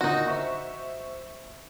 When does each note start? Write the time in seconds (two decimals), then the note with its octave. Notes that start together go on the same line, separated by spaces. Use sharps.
0.01 A#2 D3 D#3 D#4 F#4
0.28 C5 E5 C#6